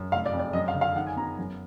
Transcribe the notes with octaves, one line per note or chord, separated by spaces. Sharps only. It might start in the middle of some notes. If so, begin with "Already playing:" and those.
Already playing: F#2
F1 F5
D5
F2
D5
F#2 D#5
F5
D3
F5
D#3 F#5
G#5
B3 A#5
F#2